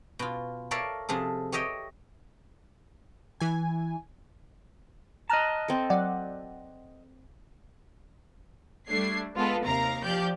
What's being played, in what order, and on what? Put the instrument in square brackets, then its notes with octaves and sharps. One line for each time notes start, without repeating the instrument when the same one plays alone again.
[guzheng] B2 F4
A4 A#4 C#5 D5 E5 F5
C3 F3 G#4 A4
G4 C#5 D#5 E5 G5
[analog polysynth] E3 G#5
[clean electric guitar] D#5 A5 [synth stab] A#5 F6 F#6
[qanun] C4 A4
[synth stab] F#3 D5 F#5
[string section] G3 A3 D4 G#6 C7
G#3 B3 F4 A4 B4
D#2 C3 A#4 F5 A#5
F3 G4 D5 G6